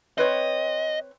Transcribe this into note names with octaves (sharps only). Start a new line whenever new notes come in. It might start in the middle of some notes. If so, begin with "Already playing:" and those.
C4 B4 C#5 D#5